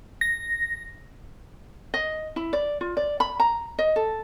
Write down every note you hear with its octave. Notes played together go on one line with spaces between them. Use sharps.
A#6
D#5
E4
D5
F4
D5
B5
A#5
D#5
A4